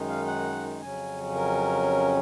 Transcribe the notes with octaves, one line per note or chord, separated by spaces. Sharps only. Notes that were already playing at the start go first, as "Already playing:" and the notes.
Already playing: F#2 D#3 G#3 D#4
F5
F#5
F2 C#3 F#3 C#4 G#5
A#4